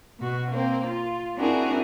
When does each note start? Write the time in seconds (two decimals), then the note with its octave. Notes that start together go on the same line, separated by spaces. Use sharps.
0.19 B2 F#4
0.51 A#3 C4
0.87 F4
1.36 C4 D4 E4 F#4 G#4 A#4